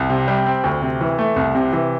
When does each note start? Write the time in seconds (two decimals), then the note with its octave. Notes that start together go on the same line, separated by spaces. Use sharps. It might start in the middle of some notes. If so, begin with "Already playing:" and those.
Already playing: C2
0.10 C3
0.28 G3
0.46 C4
0.64 D2
0.82 C3
1.01 E3
1.19 A3
1.36 C2
1.55 C3
1.73 E3